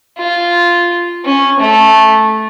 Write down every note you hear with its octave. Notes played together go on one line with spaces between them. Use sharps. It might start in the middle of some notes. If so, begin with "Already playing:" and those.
F4
C#4
A3